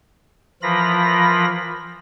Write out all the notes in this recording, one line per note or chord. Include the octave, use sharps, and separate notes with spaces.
E3 F3 F4 A#4 B5 A#6